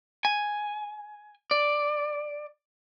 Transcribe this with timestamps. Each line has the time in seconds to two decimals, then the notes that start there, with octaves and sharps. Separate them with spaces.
0.25 G#5
1.51 D5